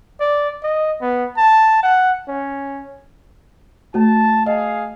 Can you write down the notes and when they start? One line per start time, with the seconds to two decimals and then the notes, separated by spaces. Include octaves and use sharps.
0.20 D5
0.63 D#5
1.01 B3
1.37 A5
1.83 F#5
2.28 C#4
3.94 A3 F#4 A5
4.46 G#4 D#5 F5